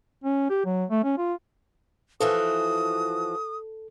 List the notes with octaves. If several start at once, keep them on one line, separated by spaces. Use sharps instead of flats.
C#4
G4
F#3
A3
C#4
F4
E3 F3 F#4 A4 D#6